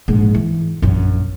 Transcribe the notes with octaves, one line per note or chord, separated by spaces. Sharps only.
A#1 G#2
E3
A#1 F#2